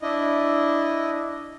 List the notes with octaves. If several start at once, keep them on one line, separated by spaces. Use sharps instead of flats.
D4 E4 D#5